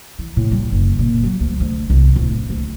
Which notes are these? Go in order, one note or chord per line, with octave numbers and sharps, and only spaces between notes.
E3
A2
G3
F#1
A#2
F#3
D2
D2
C2
D1
D2